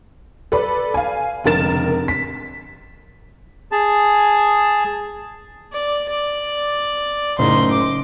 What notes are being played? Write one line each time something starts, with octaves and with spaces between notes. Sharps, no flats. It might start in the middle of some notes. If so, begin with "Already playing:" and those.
A4 B4 D5 B5
F5 G#5
F1 C#2 D3 A#4 A6 E7
B6
G#4 A5
D5
D5
F#1 A2 C#3 D#4 C6
D6